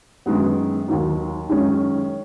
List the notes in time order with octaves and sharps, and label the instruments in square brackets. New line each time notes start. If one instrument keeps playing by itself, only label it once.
[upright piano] F#2 D#3 G#3 B3
D#2 D#3 F#3
F#2 D#3 G#3 C#4